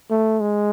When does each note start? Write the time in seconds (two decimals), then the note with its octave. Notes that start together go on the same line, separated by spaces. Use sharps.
0.11 A3
0.41 G#3